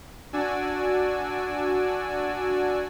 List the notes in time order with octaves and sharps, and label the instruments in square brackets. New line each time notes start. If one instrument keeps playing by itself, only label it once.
[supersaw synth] D4 F#4 D5 G#5 E6